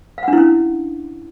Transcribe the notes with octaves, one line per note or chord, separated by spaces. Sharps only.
C#4 D4 E4 F5 F#5